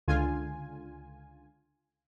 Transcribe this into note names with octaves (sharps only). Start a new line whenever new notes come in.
C#2 D3 F4 G#5